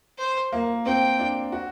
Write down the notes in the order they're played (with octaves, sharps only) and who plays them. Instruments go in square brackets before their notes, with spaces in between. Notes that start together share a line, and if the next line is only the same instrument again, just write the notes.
[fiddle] C5
[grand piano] A#3
[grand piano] C4 [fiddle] G5
[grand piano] D4
F#4